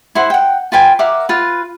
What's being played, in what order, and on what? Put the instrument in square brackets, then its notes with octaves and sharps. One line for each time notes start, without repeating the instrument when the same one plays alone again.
[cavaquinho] E4 C5 F#5
F#5 G5
F4 B4 G5 G#5
A#4 E5 F#5 D6
F4 B4